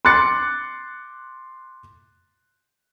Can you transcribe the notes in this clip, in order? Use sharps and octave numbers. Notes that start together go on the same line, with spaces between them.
C6 D6 F#6 A6 C#7